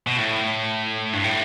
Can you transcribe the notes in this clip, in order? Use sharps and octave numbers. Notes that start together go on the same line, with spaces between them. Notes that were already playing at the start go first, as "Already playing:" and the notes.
B2
A2
G2
A2